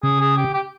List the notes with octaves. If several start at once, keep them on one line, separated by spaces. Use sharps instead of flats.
C#3 G#4
G#4
G4
G4